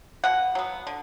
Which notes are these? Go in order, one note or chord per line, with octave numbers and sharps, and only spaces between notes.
B2 F#5
F#3 B3
D3